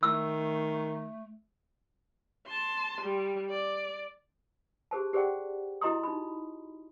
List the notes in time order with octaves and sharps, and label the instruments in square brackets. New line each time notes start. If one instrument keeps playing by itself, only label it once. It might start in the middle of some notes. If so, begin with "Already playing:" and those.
[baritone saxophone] D#3 [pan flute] A3 [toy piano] E6
[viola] A5 C6
G3
D5
[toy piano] G4 G#4 C5 A5
G4 G#4 C5 D5 F#5 G5
E4 F#4 D#5 A#5 C6 D#6
D#4 B5